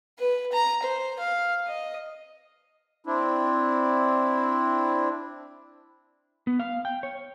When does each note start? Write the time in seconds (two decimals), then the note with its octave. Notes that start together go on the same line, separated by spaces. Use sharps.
0.19 B4
0.53 A#5
0.83 C5
1.20 F5
1.67 D#5
3.06 C4 D4 E4
6.47 B3
6.60 F5
6.85 G5
7.03 C#5